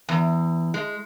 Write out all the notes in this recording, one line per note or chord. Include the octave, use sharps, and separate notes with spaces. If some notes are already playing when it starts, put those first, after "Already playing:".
E2
G#3